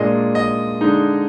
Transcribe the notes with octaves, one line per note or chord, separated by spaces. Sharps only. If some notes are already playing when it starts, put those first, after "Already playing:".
Already playing: A#2 G#3 D4 D#5
D#5
D3 G#3 D#4